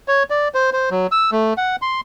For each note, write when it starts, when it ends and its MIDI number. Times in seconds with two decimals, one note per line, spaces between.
0.08 0.23 73
0.30 0.48 74
0.54 0.70 72
0.73 0.89 72
0.91 1.07 54
1.12 1.30 88
1.32 1.53 57
1.57 1.76 78
1.82 2.01 84